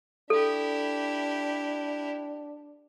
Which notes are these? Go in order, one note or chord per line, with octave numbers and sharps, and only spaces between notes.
D4 E4 G4 A4